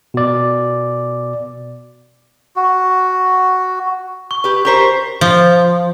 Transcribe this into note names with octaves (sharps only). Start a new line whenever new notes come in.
B2 D5
F#4
C#6
G4 B4
G4 A#4 C5 C#6 B6
F3